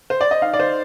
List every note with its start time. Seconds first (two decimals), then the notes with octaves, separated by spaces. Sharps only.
0.10 C5
0.21 D5
0.31 D#5
0.42 D#4 F5
0.54 D5
0.60 C5